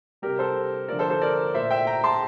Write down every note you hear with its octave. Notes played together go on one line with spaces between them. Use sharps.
C3 G3 G4 A#4
A4 C5
D3 F3 A3 A#4 D5
A4 C5
A4 C5
A#4 D5
A#2 A3 C5 E5
E5 G5
G5 A#5
A5 C6